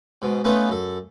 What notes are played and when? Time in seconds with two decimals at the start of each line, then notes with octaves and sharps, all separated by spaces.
0.22 G#2 B2
0.44 A3 B3 C#4 D#4 F4 B4
0.69 F#2 A4